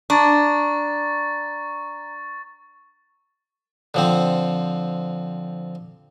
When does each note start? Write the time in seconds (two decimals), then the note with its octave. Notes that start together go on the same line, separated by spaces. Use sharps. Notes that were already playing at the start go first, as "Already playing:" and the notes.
0.10 D4 A#5 C#6 A6
3.94 D3 F3 C4